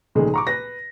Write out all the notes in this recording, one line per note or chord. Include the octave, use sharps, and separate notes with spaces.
C#2 A#2 D#3 F3 G#3 A3
A#5 C#6 D6
B4 A#6